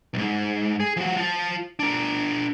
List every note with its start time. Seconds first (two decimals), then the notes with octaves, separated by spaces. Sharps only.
0.14 B1 G#2
0.80 G#4
0.97 F3 F#4
1.17 F4 A5
1.79 D4 A#4